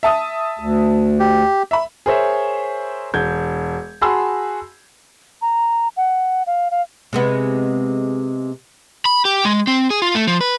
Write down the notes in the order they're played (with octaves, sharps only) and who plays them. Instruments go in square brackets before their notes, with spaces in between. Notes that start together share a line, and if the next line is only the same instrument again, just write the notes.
[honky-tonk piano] E5 A5 D#6
[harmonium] D2
[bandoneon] G4
[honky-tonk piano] E5 B5
[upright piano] G#4 A#4 C5 C#5 E5
E1 G6 G#6
F#4 G#4 A5 B5 C6 E6
[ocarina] A#5
F#5
F5
F5
[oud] C3 G#3 B3
[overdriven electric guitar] B5
G4
G#3
C4
G#4
F4
A3
F3
B4